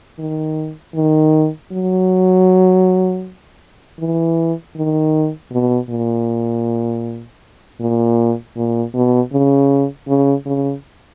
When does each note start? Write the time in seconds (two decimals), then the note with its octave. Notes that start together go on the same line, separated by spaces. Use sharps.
0.19 D#3
0.95 D#3
1.72 F#3
3.99 E3
4.76 D#3
5.52 B2
5.90 A#2
7.80 A#2
8.56 A#2
8.94 B2
9.32 C#3
10.08 C#3
10.46 C#3